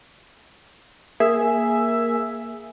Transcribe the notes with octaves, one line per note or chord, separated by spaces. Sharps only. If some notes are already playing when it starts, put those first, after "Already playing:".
A#3 G#4 E5